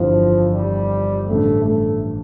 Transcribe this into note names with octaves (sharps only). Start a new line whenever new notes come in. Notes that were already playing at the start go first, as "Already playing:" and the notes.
Already playing: G1 F2 E3 F3 G3 D4
G3
A1 G2 D3 G3 A3
A3